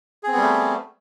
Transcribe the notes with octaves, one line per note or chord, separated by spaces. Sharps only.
G3 A3 B3 C4 G#4